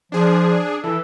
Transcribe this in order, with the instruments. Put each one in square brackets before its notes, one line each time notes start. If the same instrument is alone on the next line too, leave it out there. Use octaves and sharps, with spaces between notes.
[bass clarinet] F3 [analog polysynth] D4 G#4
[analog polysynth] E3 [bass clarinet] A4